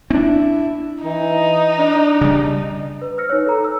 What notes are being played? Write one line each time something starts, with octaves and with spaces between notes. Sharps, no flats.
C4 D4 E4
E3 D#4
D4
C#3 G3
B4
C5 E6 F6 A#6 C#7
D#4 B4 C#5
A4 A#5
E6